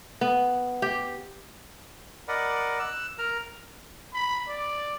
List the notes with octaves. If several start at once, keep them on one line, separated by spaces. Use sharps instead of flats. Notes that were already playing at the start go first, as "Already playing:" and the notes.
B3
G4
A#4 D5 D#5 F#5 B5
E6 F#6
A#4 A#5 F6
B5
D5